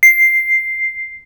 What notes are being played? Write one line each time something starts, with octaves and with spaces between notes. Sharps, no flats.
C7